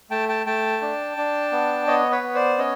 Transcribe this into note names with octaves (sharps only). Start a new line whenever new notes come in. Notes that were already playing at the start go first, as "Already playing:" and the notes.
A3 G5 A5
G5 A5
A3 G5 A5
D4
D4
B3
B3 C#5 D#5
B4 C#5
B3
C5 D5
C#4 C#5 D#5